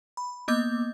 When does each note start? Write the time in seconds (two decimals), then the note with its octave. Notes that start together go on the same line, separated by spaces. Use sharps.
0.17 B5
0.48 A#3 B3 D#5 D6 G6